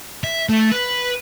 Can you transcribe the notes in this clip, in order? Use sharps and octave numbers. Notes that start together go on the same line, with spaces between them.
E5
A3
B4